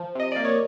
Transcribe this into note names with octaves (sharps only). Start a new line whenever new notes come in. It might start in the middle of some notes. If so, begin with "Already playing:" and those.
Already playing: F3
C3 D#5
A#3 D5
C#5